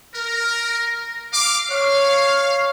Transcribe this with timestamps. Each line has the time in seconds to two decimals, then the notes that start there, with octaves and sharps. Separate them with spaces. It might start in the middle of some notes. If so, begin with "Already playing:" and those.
0.14 A#4
1.33 F5 D6
1.71 C#5 F5